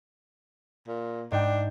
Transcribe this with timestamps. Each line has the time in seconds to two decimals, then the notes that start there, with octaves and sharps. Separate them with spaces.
0.87 A#2
1.32 G#2 D4 G5